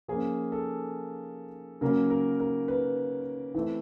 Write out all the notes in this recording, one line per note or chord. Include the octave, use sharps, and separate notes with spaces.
F3 A#3 C#4 G#4
A4
C#3 F#3 A#3 C#4 A#4
A#4
A#4
B4
E3 A3 C4